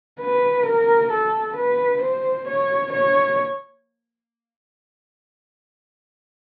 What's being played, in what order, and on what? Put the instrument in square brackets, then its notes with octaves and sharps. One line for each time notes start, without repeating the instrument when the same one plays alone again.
[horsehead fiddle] B4
A#4
A4
B4
C5
C#5
C#5